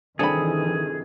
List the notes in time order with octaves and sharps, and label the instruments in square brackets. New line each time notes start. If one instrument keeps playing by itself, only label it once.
[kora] G2 C3 G3 [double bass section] D#3 E3 [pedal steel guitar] G#4 [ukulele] A4 B5